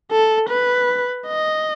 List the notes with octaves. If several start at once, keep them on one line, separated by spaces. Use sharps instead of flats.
A4
B4
D#5